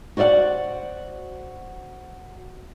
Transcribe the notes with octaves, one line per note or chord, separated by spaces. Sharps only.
F#4 C5 D5 E5 F#5